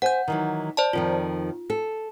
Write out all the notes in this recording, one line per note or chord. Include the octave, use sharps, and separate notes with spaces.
C5 F#5 G#5 G6
D#3 E3 F#3
C5 D5 A5
F2 D#3 F3 F4
A4